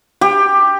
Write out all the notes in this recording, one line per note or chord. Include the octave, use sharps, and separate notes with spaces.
G4